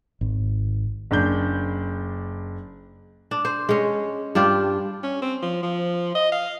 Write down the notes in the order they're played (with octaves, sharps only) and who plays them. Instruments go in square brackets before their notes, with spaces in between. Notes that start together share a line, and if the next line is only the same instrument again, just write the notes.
[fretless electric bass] G#1
[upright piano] F#1 D4 G6
[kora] D4
C5
G#3 C#4
G2 D4 F4 G4
[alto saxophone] C#4
C4
F3
F3
D#5
F5